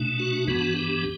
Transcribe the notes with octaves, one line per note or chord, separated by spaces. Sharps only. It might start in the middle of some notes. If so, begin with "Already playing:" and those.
Already playing: B2 A3 D4
F#4
G2 E3 B3 D4 F#4
G4